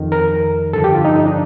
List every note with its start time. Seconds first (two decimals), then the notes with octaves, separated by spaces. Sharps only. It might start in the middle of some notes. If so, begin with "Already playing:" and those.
Already playing: F2 D#3
0.12 A#4
0.73 G2 D3 F3 A4
0.84 G4
0.94 F4
1.05 D#4
1.15 D#4
1.26 D4